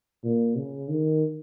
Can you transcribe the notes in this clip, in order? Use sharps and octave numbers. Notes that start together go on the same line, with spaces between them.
A#2
C#3
D#3